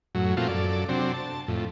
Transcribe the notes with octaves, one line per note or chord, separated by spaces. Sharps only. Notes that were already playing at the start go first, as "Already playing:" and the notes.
F#2 A2 F#3
A#2 F3 A3 C4 F4 F#4
F#2 A4 D5
C3 F#3 C4 D4
A5
F2 A2